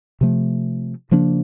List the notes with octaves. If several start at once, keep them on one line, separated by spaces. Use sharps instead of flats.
C3 F3 A3
C#3 F3 A#3 D4